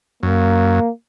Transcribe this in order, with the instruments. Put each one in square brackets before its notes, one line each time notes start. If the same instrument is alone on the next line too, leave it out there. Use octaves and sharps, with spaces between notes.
[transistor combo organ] F#2 [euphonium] A#3